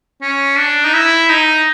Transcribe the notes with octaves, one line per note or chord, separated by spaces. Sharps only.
C#4
D4
D#4
E4
D#4